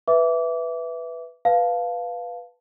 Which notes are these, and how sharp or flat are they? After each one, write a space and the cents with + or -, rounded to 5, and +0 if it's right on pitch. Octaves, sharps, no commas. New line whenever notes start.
B4 +0 E5 +0 D6 -25
B4 -5 F5 +0 A5 +0